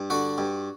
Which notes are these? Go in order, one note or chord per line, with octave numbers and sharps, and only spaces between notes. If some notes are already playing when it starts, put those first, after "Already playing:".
Already playing: G2
D3 F#4
G2